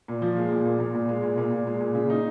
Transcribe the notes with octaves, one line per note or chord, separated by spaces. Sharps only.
A#2
F3
G#3
A#2
A#2
A#2
A#2
G#3
A#2
A#2
A#2
G#3
A#2
C#3
D#4